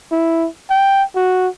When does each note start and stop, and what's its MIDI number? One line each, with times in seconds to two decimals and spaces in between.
0.12 0.48 64
0.70 1.03 79
1.16 1.48 66